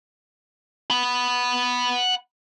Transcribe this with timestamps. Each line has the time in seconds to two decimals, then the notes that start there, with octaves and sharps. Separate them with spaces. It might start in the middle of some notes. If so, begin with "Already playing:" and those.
0.90 F#5 B5